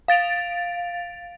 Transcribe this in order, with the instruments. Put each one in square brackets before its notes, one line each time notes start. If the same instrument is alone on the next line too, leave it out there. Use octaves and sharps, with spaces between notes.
[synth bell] F5 A6 D7 F7